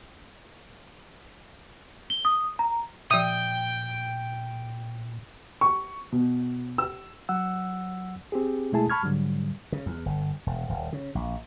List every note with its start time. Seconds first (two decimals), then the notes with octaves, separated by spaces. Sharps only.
2.10 G7
2.25 D#6
2.59 A#5
3.11 A#2 F3 E5 G5 D#6
5.61 C#6
6.12 B2
6.78 E6
7.29 F#3 F#5 E6
8.32 C4 G4 G#4
8.72 B2 G#3 A3 E4 G#4 A5
8.90 A5 B5 C#6 F6 G#6
9.03 G#2 D3 F#3 G3
9.72 C#3
9.86 E2
10.06 G1
10.47 E1
10.69 D#1
10.93 C#3
11.15 A#1